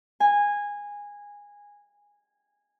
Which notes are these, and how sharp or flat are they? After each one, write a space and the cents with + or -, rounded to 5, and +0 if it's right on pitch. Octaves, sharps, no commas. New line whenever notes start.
G#5 -15